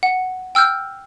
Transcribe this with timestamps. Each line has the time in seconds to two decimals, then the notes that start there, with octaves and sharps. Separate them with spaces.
0.03 F#5
0.55 G5 E6 F6 G6